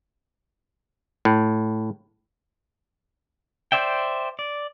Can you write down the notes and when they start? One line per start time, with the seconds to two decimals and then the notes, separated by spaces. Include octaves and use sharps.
1.25 A2
3.72 C5 D5 E5 G5
4.39 D5